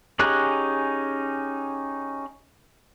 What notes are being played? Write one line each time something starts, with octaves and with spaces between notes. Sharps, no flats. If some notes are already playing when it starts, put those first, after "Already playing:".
C#4 D#4 G4 G#4 F#6